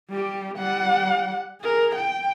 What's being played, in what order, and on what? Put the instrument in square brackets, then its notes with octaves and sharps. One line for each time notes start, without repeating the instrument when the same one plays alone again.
[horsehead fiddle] G3 G4
G3 F#5
G#4 A#4
G5